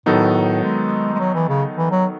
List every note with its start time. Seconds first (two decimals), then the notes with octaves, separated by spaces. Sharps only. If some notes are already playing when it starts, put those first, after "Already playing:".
0.06 A2 D#3 F#3 B3 D#4 A4
0.63 G#3
1.15 G#3
1.20 F#3
1.35 E3
1.49 C#3
1.77 E3
1.91 F#3